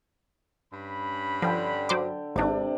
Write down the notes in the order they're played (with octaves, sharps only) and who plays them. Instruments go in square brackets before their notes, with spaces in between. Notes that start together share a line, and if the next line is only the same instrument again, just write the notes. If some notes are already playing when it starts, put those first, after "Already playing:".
[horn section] G2 C#4 B5
[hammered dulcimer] D3 G5 [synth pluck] F3
[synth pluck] F#3 C5 D6
[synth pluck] G#1 G#2 [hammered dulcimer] C3 D4